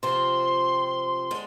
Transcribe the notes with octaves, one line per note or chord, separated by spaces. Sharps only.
C3 F3 C4 F4 C6
D3 G#3